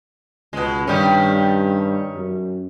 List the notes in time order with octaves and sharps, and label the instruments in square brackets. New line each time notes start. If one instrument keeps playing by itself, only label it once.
[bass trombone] C#2 [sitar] B2 G#3
[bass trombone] G2 [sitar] D#3 G3 C#4
[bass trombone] F#2